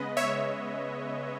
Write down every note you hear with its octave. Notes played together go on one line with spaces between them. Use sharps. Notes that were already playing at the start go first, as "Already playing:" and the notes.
Already playing: C#3 G#3 B3 B4 D#5
C#5 E5